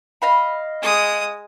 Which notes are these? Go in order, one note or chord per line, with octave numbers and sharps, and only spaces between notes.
D#5 F5 B5
G#3 D#6